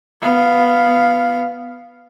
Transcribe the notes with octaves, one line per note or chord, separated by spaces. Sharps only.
B3 F5